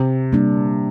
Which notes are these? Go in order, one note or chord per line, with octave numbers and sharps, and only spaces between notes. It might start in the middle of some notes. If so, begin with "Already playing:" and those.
Already playing: C3
G3 A#3 D4